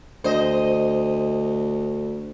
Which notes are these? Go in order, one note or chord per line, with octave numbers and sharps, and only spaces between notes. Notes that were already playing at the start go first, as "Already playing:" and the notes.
D2 C5 D#5